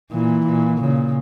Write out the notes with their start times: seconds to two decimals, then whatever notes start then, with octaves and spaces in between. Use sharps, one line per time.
0.11 A#2 E3
0.46 A#2
0.81 A#2 C#3